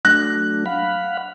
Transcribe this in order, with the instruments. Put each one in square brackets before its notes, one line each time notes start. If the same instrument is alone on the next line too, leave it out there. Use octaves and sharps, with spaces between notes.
[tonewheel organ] F#3 A3 D4 [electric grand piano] F#6 A#6
[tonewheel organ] F5 F#5 B5